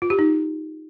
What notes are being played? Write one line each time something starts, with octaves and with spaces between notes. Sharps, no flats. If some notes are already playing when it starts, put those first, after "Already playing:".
F4
G4
D#4